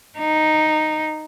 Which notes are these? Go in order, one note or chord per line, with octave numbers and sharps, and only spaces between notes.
D#4